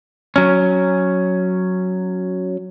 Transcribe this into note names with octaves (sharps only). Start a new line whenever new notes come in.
F#3 C#4